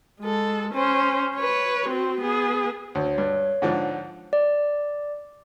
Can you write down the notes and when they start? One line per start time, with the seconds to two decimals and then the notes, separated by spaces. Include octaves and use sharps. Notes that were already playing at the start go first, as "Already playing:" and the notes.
0.20 G#3 A4
0.74 C#4 C5
1.36 B4 C#5
1.89 C4 F#4
2.21 B3 G#4
2.95 D2 C#5
3.18 G2
3.62 G#2 D3 F3
4.33 D5